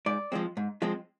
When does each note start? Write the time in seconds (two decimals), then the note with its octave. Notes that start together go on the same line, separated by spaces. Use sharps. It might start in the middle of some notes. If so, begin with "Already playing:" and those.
0.06 G#2 D5
0.32 F3 G#3 C4
0.57 G#2
0.82 F3 G#3 C4